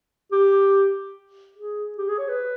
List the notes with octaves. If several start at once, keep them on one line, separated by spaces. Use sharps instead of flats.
G4
G#4
G4
G#4
C#5
B4